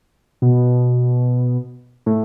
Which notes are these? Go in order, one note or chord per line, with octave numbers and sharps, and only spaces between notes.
B2
A2